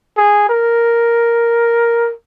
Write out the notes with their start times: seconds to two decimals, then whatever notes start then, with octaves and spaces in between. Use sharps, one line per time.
0.17 G#4
0.49 A#4